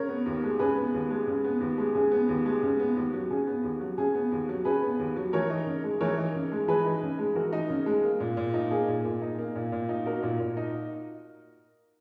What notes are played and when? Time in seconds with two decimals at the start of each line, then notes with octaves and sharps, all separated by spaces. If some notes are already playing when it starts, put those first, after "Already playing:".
Already playing: C#3 A#4 C#5
0.09 B3
0.26 D#2
0.43 G#3
0.59 C#3 G#4 B4
0.76 B3
0.94 D#2
1.10 G#3
1.27 C#3
1.45 B3
1.61 D#2
1.78 G#3
1.95 C#3 G#4
2.12 B3
2.29 D#2
2.46 G#3
2.63 C#3
2.79 B3
2.97 D#2
3.13 F#3
3.30 C#3 G#4
3.47 B3
3.64 D#2
3.81 F#3
3.98 C#3 G#4
4.15 B3
4.32 D#2
4.49 F#3
4.65 C#3 G#4 B4
4.82 B3
4.99 D#2
5.16 F#3
5.33 E3 A#4 C#5
5.50 D#4
5.66 C#3
5.84 G#3
6.00 E3 A#4 C#5
6.18 D#4
6.35 C#3
6.52 G#3
6.68 E3 G#4 B4
6.85 D#4
7.02 C#3
7.19 G#3
7.35 E3 F#4 A#4
7.53 D#4
7.70 C#3
7.86 G#3
8.04 A#3
8.20 A#2
8.37 A#2
8.54 D#4
8.71 A#3 G#4
8.88 A#2
9.05 A#2
9.22 D#4
9.38 A#3
9.55 A#2
9.72 A#2
9.89 D#4
10.06 A#3 F#4 A#4
10.23 A#2
10.40 A#2
10.57 D#4